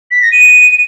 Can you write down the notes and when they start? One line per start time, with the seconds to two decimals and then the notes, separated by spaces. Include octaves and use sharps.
0.11 B6
0.22 A#6
0.32 D#7